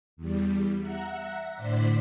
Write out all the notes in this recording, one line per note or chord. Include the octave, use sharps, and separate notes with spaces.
E2 G3
E5 F#5 A#5
A2 D3 C5 D5 B6